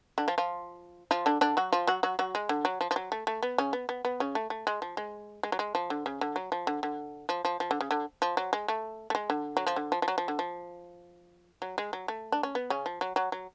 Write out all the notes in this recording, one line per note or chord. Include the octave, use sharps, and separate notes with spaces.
D3 D4
F3 F4
F3 F4
F3 F4
D3 D4
D3 D4
F#3 F#4
F3 F4
F#3 F#4
F#3 F#4
F#3 F#4
G#3
D3
F#3
F3
F3
F#3
A3
A3
B3
C#3 C#4
B3
B3
B3
C#3 C#4
A3
A3
G#3
F3
G#3
G#3
F#3
G#3
F3
D3
C#3
D3
F#3
F3
D3
D3
F3
F3
F3
D3
C#3
D3
F3
F#3
G#3
A3
A3
G#3
D3
F#3
F3
D3
F3
F3
F#3
F3
D3
F3
F#3
G#3
F#3
A3
D4
C#4
B3
C#3 C#4
F3
F#3
F#3
F#3